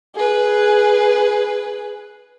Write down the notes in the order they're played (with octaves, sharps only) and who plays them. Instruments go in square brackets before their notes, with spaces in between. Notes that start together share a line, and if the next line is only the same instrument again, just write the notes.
[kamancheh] G#4 B4